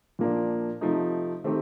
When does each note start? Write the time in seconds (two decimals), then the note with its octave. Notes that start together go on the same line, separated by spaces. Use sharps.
0.19 A#2 F3 A#3 D4
0.81 C3 F3 A3 D#4
1.44 D#3 A3 C4 G4